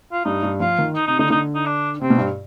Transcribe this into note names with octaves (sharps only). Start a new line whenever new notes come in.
F4
G2 D#4
G2
F3 F4
D#3
D#4
C3 D#4
D3 D#4
D3 D#4
D#4
D4
C3 C4
B2
G2